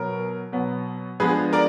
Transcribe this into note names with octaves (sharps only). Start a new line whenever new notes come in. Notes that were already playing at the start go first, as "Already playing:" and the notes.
Already playing: B2 F#3 B3 A#4
B2 F#3 B3
F3 G#3 B3 D4 G#4 B4
A#4 D5